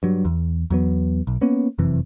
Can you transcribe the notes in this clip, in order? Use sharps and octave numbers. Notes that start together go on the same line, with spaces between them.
G2 F#3
E2
E2 F#3 B3
B1
A#3 B3 C#4
F1 F#2 C3 E3